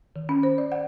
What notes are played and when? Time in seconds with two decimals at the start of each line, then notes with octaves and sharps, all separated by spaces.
0.16 D#3
0.29 C#4
0.43 C5
0.58 D5
0.72 F#5